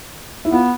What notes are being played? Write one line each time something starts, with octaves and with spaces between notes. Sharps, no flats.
E4
B3 F4